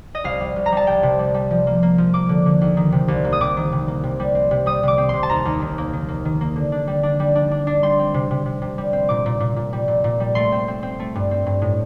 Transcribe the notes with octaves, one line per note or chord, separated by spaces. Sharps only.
D#5
C2 F5
G3
C2
A#5
G3 A5
C2 G5
C3
G3
G3
F3
A#3
A#3
F3
A#3 D6
D3
D3
D#2
D#3
C3
C2
A#3
D#6
C3 D6
D#3
C3
A#3
C3
G3
C4
C3
G3 D#6
C3 D6
C4
C3 C6
A5
D#2 A#5
D#2
D#3
A#3
D#3
A#3
D#3
A#3
D3
D4
G3
D4
G3
D4
D4
D4
G3 C6
C4
C3
C3
C3
C3
G3
C4
A#2 D6
A#2
A#2
A#2
G3
A#2
A#2
G3
A3 C6
C4
C4
C4
A3
G2
C4
G2
A2